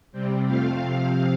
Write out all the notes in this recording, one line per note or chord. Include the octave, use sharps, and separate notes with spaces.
C3 G3 C4
F2 F3 A3 C4 F5
C3 F3 C4 F5